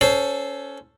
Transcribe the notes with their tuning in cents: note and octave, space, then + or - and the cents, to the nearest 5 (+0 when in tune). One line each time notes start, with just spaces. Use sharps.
C#4 +15 A4 +0 C5 +0